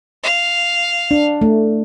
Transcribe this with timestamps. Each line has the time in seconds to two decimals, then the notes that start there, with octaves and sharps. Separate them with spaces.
0.23 F5
1.11 D4
1.41 A3